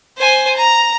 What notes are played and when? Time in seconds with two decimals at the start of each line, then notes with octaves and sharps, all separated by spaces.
0.17 C5 G#5
0.56 A#5